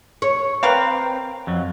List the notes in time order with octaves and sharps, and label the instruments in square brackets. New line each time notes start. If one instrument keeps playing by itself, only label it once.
[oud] C#5
[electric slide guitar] C4 [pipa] A#4 B4 F5
[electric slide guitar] F2 F#3